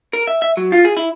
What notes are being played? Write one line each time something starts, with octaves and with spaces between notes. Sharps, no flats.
A#4
E5
E5
F#3
F4
G#4
E4